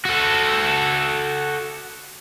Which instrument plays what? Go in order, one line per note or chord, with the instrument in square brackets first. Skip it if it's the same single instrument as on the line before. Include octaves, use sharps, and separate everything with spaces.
[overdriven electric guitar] F#4 A4